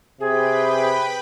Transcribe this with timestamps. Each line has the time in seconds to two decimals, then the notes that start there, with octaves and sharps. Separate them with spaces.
0.20 C3 G#4 B4 G5 B5